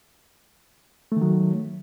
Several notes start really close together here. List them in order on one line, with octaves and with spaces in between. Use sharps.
A3 D#3 F#3